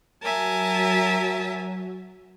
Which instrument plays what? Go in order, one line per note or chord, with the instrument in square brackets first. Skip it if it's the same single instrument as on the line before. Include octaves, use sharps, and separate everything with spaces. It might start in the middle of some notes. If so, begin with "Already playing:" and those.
[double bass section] F#3 [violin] A#4 G#5 [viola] E5 A5